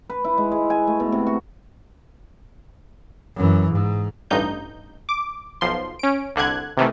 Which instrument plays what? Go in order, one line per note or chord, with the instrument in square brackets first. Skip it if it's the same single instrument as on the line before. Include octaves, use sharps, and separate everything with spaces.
[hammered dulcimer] B4
E4
G#3
G#3
G#5
A3
B2
C3
F#4
[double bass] F#2 E3
G#2
[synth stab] A1 G2 D#4 G6
D6
B1 F3 C6
C#4 D7
C2 D3 F#6 G#6
C3 D#3 E3 A3